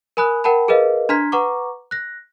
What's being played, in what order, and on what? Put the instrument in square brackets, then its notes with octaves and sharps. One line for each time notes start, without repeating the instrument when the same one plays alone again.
[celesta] A#4 G#5 B5 D#6 F#6
A#4 F#5 G5 A5 B5
G#4 A#4 B4 D#5 F5
D4 A#5 C6 F6 G#6 B6
B4 F#5 A#5 C#6 D6
F#6 A#6